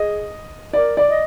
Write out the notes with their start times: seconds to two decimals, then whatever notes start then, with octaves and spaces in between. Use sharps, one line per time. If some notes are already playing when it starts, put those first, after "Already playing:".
Already playing: G#4 D#5
0.73 A#4 D5
0.97 D5
1.09 D#5